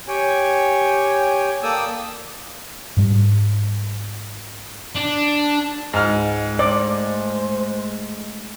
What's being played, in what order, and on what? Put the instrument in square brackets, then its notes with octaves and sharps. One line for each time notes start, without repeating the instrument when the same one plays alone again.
[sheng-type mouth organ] G4 C#5 G5 G#5
A#3 A4 D5 G5 D#6 E6
[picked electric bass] G#2 G3
[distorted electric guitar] D4
[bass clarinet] C#2 [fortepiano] G#2 F6
[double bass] G#3 A3 [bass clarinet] C5 [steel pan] D5